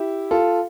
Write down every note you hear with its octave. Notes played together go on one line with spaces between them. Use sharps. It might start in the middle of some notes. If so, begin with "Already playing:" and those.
Already playing: E4 G4
F4 A4